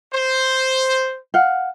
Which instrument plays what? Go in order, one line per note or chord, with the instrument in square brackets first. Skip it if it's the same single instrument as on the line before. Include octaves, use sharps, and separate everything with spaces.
[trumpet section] C5
[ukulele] F5 F#5